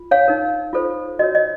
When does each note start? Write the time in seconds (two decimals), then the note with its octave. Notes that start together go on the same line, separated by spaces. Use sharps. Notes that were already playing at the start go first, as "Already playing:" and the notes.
Already playing: F4
0.11 C#5 F5
0.27 D#4 A#4 C#5
0.73 F4 A4 C5
1.19 F#4 A#4 C#5 D#5
1.35 D#5